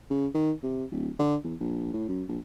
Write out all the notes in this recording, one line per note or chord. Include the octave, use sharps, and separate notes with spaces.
C#3
D#3
C3
D1
D3
E2
A#1
A2
F#2
A#1